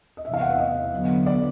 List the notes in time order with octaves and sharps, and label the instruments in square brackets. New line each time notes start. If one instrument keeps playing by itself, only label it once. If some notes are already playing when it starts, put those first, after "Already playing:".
[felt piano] D#5
[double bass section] E2 C3 E3 [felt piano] E5
[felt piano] F5
F#5
E5
D#5
[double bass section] D3 F#3 B3
[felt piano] D5